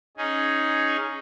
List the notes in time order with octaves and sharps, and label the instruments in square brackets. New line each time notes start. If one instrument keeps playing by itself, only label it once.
[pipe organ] C#4 D#4 G#4